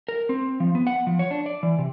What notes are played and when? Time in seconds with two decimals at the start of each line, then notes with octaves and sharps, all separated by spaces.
0.08 A#4
0.29 C4
0.60 F3
0.75 B3
0.87 F#5
1.07 F3
1.19 C#5
1.31 D4
1.46 D5
1.63 E3
1.79 C3